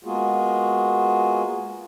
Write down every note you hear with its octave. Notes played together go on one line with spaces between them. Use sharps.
G#3 A#3 B3 F4 F#4 G#4